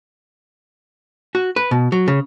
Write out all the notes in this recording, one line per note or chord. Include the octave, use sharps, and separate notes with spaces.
F#4
B4
B2
F#3
C#3